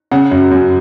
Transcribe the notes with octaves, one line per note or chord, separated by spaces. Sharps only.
C#3 F#5
F#2
F#2